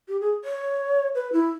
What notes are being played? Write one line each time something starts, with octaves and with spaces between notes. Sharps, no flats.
G4
G#4
C#5
B4
E4